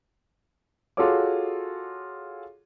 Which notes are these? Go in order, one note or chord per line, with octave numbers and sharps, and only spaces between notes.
F4 F#4 G#4 A4 C#5 D6